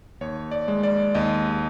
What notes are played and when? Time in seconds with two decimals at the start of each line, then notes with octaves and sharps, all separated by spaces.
0.21 D#2 C#5
0.51 D5
0.68 G#3
0.83 D5
1.15 D#2 D#5